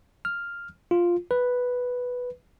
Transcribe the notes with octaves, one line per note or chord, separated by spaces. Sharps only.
F6
F4
B4